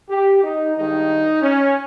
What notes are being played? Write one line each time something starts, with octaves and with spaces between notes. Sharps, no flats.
G4
D#4
G2 D#3 G#3 D#4
C#4